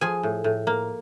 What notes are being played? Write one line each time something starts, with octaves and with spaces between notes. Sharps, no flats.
F3 G#4 G#5
A2
A2
A#3